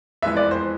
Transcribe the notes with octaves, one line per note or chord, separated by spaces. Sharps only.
F2 E3 G#3 B3 E5
D5
C5